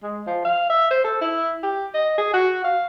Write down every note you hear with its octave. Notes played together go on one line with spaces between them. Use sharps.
G#3
F3
F5
E5
C5
A4
E4
G4
D#5
G#4
F#4
F5